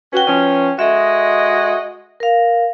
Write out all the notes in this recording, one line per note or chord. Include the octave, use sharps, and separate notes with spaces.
C#4 F#4 B4 G5
F3 C#4
G#3 F#4 A4 D#5 E5
A#4 F5